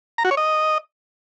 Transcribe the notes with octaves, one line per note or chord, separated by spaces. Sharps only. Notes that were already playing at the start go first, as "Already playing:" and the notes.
A#5
F#4
C#5
D#5